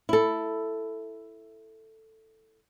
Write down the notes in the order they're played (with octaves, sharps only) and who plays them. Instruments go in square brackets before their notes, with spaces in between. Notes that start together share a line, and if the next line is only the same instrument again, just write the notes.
[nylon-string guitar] E4 A4